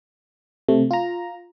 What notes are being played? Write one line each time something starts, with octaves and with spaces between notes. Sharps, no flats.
C3 A3
F4 A#5